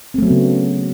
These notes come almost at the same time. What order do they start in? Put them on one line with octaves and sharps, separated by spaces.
C4 A3 F#3 B3 C#3